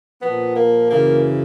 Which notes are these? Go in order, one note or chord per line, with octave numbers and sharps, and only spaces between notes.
A#2 F3 B3
A#3
F#2 C#3 E3 A#3